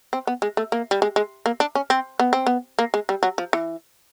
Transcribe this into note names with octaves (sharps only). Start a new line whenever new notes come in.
C4
B3
G#3
A3
A#3
G3
G#3
G#3
A#3
D4
C#4
C4
B3
C4
B3
A#3
G#3
G3
F#3
F3
E3